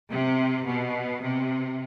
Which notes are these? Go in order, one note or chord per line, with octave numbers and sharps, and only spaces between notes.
C3
B2
C3